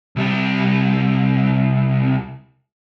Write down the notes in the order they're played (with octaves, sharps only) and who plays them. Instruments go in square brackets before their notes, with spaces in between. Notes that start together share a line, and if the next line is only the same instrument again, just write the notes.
[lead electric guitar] C2 G3